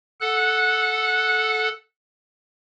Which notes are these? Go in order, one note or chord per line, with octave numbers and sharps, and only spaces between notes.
A4 F#5 F#6